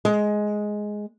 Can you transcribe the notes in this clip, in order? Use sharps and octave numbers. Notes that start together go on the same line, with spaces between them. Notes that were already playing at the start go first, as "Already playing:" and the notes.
G#3